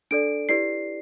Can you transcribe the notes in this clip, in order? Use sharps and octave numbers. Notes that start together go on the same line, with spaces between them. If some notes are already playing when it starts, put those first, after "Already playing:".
D4 A4 D5 D7
E4 G4 B4 D5 C7